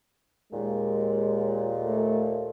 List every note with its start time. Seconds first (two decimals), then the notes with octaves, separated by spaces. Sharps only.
0.53 D#2 A#2 G#3
1.84 A3